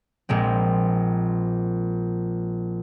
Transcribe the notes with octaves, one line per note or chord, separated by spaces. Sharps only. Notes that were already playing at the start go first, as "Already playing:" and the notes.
A#1 A#2 G#3 C4